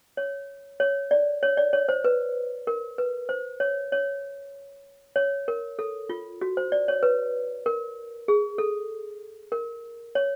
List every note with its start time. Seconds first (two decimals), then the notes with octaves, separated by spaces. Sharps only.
0.17 C#5
0.80 C#5
1.11 D5
1.43 C#5
1.57 D5
1.73 C#5
1.89 C5
2.04 B4
2.67 A#4
2.98 B4
3.29 C5
3.60 C#5
3.92 C#5
5.16 C#5
5.48 A#4
5.79 A4
6.09 F4
6.41 F#4
6.57 C5
6.72 D5
6.88 C#5
7.03 B4
7.66 A#4
8.28 G#4
8.58 A4
9.52 A#4
10.15 C#5